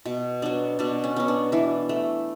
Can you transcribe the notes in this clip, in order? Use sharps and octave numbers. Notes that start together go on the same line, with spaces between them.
B2
F#3 B3 D4
B2 D4
C#4
F#3 B3
D4
E3 D4
A3